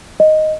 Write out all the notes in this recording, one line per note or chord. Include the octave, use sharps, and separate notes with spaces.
D#5